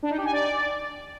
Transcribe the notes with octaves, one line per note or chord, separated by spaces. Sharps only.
D4
D#4
G4
G#5
D5